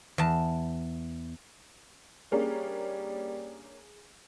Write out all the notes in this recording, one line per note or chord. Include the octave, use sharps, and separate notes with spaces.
E2 A5
G3 A#3 C#4 D4 G#4